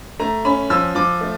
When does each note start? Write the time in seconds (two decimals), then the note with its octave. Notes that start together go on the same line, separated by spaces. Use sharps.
0.20 A3 A#5
0.45 C#4 B5
0.70 F3 E6
0.95 F3 D6
1.21 A3